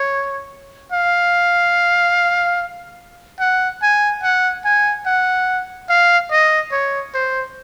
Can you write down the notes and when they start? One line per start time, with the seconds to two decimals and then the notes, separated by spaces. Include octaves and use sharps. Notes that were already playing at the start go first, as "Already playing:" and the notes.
Already playing: C#5
0.92 F5
3.40 F#5
3.82 G#5
4.23 F#5
4.65 G#5
5.06 F#5
5.89 F5
6.31 D#5
6.72 C#5
7.14 C5